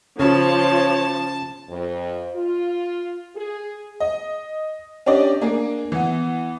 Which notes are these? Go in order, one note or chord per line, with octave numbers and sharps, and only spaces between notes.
C#3 F3 C#5 A5
F2
F4
G#4
D#5
C#4 D4 G4 D5 D#5
A#3 D4 G#4
E3 B3